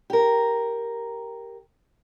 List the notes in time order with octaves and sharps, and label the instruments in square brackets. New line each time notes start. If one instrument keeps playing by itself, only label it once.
[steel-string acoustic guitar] G4 A#4